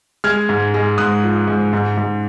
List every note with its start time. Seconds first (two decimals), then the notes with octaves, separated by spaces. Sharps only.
0.24 G#3 F6 G#6
0.49 G#2
0.74 G#3
0.98 G#2 D#6 F#6
1.24 F3
1.48 G#2
1.73 G#2
1.97 G#2